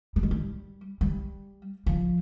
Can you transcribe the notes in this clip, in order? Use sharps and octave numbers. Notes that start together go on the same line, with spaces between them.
G3
G#3
G3
G3
F3